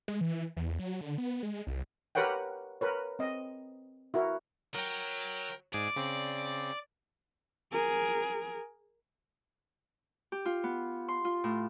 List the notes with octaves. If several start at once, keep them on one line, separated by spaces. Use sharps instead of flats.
G#3
E3
E2
F#3
D3
B3
G#3
C2
G4 A#4 B4 C#5 F#5 G5
A#4 B4 C#5
C4 D#5
E4 F#4 A#4
F#3 A#4 G5
G#2 G#4 D5
C#3 C4
G#4 A#4
G4
F4
B3
C6
F4
A2